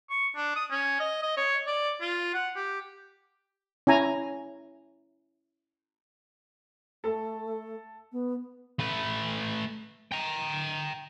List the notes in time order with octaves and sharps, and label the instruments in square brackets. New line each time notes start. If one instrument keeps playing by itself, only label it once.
[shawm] C#6
D4
D#6
C#4
D#5
D#5
C#5
D5
F4
F#5
G4
[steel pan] C#4 E4 G#5 A#5
[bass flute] A3 [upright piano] A4 A5
[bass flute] B3
[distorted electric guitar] A3 B4
G5 A#5